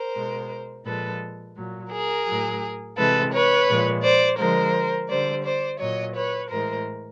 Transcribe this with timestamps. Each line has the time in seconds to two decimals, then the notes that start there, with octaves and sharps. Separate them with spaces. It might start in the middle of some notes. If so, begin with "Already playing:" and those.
Already playing: A#4 C5
0.14 B2 G#3
0.85 A#2 F3 G#3 A4 B4
1.56 A#2 F#3
1.91 G#4 A#4
2.26 A2 F#3
2.96 C3 E3 G#3 A4 B4
3.32 B4 C#5
3.67 A#2 F3 G#3
4.03 C5 D5
4.38 D3 F3 G#3 A#4 C5
5.09 D3 G3 C5 D5
5.44 C5 D5
5.79 A#2 F#3 C#5 D#5
6.15 B4 C#5
6.50 A2 E3 G#3 A#4 C5